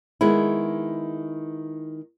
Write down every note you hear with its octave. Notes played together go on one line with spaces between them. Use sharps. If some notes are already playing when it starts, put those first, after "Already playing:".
D#3 G#3 B3 E4